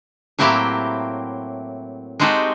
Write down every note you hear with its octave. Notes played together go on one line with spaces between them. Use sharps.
A2 F#3 A#3 C4 E4 G4
G#3 C4 D#4 F#4 G4 A4